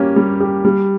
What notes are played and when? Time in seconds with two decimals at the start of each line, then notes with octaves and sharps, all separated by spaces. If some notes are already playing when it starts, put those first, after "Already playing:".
Already playing: G3 A#3 C#4 G4
0.16 G3
0.40 G4
0.65 G3